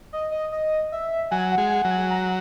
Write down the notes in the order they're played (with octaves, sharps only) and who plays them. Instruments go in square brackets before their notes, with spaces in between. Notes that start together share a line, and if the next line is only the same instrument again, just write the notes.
[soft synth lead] D#5
D#5
D#5
E5
[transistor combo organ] F#3 [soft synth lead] G#5
[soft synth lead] F#5
[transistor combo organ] G#3
[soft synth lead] F#5
[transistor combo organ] F#3
[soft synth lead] G#5
A#5